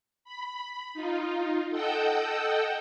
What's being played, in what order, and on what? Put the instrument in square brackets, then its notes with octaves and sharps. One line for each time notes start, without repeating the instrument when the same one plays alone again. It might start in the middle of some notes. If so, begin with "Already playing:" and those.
[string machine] B5
D#4 F4
A4 D#5 F#5 G5 E6 G6